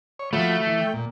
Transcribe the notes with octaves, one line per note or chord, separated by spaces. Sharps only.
C#5
F3 A3 F#4 B5
E3
G5
A#2